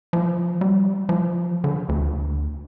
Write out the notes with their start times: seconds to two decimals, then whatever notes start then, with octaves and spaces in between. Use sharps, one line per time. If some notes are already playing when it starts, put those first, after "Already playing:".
0.13 F3
0.61 G3
1.09 F3
1.64 D3
1.89 D2